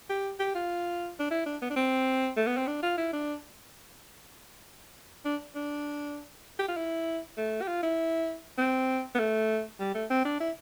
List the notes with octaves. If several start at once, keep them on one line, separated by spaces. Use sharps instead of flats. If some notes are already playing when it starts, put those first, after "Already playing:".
G4
G4
F4
D4
E4
D4
B3
D4
C4
A3
B3
C4
D4
F4
E4
D4
D4
D4
G4
F4
E4
A3
G4
F4
E4
C4
B3
A3
G3
A3
C4
D4
E4